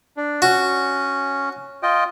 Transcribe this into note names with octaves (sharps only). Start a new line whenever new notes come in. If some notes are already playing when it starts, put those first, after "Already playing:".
D4
C#4 F#4
F4 D#5 G5